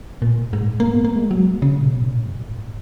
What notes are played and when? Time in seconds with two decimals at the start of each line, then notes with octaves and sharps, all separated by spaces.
0.22 A#2
0.53 G#2
0.80 A#3
0.92 B3
1.05 A#3
1.16 G#3
1.31 F#3
1.62 C#3
1.80 A#2
1.86 B2
2.02 G#2
2.10 A#2
2.26 F#2
2.33 G#2